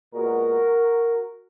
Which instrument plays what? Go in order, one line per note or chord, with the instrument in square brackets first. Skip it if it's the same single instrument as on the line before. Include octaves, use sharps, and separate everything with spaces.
[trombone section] A#2 G#3 B3 F#4 A#4